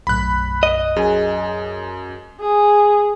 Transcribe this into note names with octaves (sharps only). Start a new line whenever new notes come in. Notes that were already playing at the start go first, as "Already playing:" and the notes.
B1 F#2 A2 B5 F#6
D#5
F#2 G#4 G#5
G#4